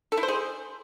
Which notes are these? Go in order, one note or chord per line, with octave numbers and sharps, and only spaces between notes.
A4
E4
C5
G#4